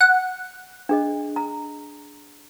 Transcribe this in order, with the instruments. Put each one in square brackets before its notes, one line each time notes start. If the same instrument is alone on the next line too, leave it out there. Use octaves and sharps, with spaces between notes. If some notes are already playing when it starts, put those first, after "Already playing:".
[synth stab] F#5
[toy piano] D4 G#4 D#5
A#5